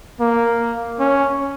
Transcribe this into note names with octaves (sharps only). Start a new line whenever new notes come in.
A#3
C#4